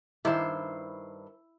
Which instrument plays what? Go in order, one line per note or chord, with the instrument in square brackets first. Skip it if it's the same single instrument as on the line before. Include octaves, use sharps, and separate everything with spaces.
[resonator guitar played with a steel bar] G2 D#3 C5 [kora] E4 E5